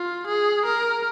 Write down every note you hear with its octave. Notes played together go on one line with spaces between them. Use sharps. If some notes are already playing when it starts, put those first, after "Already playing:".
Already playing: F4
G#4
A#4